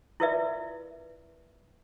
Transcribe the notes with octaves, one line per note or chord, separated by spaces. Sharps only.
E4 F4 A#4 B4 D5 E5